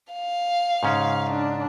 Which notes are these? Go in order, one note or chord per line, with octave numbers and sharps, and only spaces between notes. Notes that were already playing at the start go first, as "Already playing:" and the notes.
F5
G#2 C#3 C#4
D4